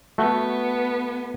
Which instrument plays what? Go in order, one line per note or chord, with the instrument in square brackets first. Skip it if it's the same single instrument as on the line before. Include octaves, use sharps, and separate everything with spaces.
[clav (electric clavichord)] A3 F#4 [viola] B3